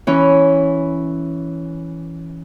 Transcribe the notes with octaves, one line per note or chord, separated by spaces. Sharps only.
E3 C#4